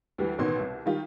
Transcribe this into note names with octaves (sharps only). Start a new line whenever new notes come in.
D2 E3 G3
A1 B2 D#3 B3 C6 G#6
C2
D#3 G3 F4 G4